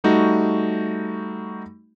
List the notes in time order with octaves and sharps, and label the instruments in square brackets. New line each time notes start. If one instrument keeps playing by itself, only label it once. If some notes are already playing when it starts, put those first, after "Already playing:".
[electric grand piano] G3 A3 D#4 F#4